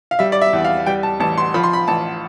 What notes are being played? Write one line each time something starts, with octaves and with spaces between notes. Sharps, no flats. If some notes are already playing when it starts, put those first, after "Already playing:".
F5
G3 E5
D5
E5
E2
F5
G3 G5
A5
A1 A5
C6
F3 B5
C6
B5
A1 A5